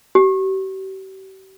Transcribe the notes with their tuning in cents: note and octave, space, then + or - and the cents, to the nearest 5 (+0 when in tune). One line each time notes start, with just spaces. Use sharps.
G4 -40